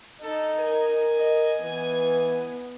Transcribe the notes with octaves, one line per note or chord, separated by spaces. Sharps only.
D#4 A4
A#4 G#5
D#5
E3 B3